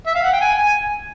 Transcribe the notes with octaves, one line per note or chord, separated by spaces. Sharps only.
E5
F5
F#5
G5
G#5
G#5